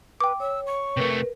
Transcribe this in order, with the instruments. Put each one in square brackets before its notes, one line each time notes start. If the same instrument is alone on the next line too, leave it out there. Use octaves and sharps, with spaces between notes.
[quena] B4 [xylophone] G5 D6
[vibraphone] C#5 [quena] E6
[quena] C#6
[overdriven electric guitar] C3 A3 [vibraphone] A#4 B4